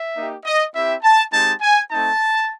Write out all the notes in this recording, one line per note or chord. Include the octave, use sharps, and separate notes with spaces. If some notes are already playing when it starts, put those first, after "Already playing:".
Already playing: E5
A#3 D#4 G4
D#5
C4 E4 G4 E5
A5
G#3 C4 D#4 G4 A5
G#5
A3 C4 D#4 A5